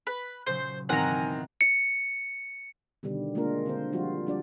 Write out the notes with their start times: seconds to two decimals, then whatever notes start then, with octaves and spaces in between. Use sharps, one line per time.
0.07 B4
0.46 A#2 C#3 F#3 C5
0.89 G#2 B2 D#3 E3 C4 F#5 G#5 A#5
1.61 C#7
3.03 B2 D3 D#3 G3
3.35 G#3 A#3 D4 F4 A#4
3.66 D3 C4 C5
3.93 F3 G3 F4 F#4
4.27 G3 D4 D5